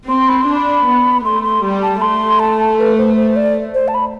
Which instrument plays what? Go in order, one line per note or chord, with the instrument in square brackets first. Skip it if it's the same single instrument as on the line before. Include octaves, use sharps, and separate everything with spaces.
[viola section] C4 [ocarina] C6
[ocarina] B5
C6
[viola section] D4
[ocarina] B5
[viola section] B3
[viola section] A3 [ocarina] C6
[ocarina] C6
[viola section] G3
[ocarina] A5
[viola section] A3 [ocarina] C6
[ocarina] A5
B4
C5
C5
D5
C5
A5
B5